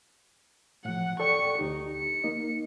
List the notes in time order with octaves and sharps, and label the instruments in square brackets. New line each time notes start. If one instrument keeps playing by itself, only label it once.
[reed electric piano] A2 F3 [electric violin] F#5
[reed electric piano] A4 D5 G5 [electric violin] C#6 C#7
[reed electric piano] D2 G4 [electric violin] D#4
[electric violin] C#7
[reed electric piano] A#3 D#4 D#5